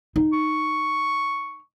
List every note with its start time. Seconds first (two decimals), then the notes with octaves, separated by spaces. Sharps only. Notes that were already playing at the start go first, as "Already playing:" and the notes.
0.16 D#4
0.33 C#6